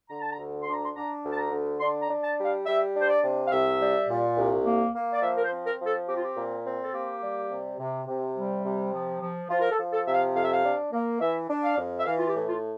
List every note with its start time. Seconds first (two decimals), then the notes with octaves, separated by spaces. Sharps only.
0.10 D3 A#5
0.21 A5
0.33 A#5
0.39 D2
0.63 D4 C6
0.74 A#5
0.84 C6
0.96 D4 A#5
1.24 D2
1.33 A5
1.38 A#5
1.52 D3
1.80 D4 C6
2.02 A#5
2.09 D4
2.24 A5
2.38 G3
2.45 F5
2.66 G3 E5
2.95 D4
3.01 C5
3.09 D5
3.23 C3
3.46 F5
3.52 C2 E5
3.80 G3
4.09 A#2
4.37 C2
4.66 A#3
4.94 A#3
5.13 D5
5.22 F3 E5
5.37 A#4
5.44 C5
5.51 C4
5.65 A#4
5.80 F3
5.86 A4
6.08 C4 G4
6.16 F4
6.23 G4
6.36 A#2
6.65 C4
6.83 A4
6.93 A#3 G4
7.22 G3
7.51 C3
7.79 C3
8.07 C3
8.36 G3
8.64 C3
8.93 F3
9.21 F3
9.49 F3 F4
9.61 A#4
9.71 A4
9.78 F3
9.93 A4
10.07 C3 E5
10.14 F5
10.35 F2 F5
10.45 E5
10.53 F5
10.63 D4
10.92 A#3
11.20 E3 E5
11.49 D4
11.64 F5
11.78 F2
12.00 E5
12.06 E3 F5
12.18 F4
12.28 G4
12.35 A2
12.49 F4